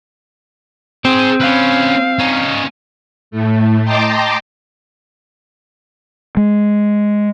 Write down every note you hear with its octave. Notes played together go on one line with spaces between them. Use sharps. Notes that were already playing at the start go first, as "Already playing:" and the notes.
C4 G#4 C5
C#4 B4 F5
C#4 D#4
A2 A3
D#5 G5 A5 A#5 C6 D6
G#3